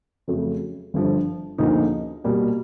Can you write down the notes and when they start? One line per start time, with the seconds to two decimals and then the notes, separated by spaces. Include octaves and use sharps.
0.28 F2 C#3 F#3 A3
0.94 G1 G2 D3 F3
1.58 D2 C#3 F3 A#3 D#4
2.24 B2 G3 A#3